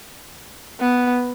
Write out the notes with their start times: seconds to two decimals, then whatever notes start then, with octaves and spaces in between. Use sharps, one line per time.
0.79 B3